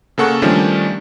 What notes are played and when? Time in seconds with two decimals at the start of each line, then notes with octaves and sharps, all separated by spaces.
0.18 C#3 A#3 A4 F#5 C#6
0.42 D#3 F3 G3 A3 C#4 D4